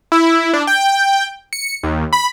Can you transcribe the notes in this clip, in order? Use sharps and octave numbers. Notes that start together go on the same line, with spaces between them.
E4
D4
G5
C#7
D#2
B5